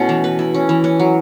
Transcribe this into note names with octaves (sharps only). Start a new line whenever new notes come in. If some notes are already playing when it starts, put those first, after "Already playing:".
Already playing: B2 A3 C#4 E4
E3
B4
E4
C#4
E3
C#4
F#3